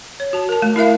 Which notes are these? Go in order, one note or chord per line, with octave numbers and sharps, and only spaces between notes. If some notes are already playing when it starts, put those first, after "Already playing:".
C#5
F#4 A5
A#4 A5
A3
E4 A#4 E5 F5